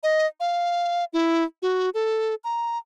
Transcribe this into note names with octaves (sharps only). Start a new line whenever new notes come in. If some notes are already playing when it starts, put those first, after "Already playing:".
D#5
F5
E4
F#4
A4
A#5